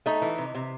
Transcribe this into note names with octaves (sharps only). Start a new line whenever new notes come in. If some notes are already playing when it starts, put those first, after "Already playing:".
A3 D#4
E3
C3
C3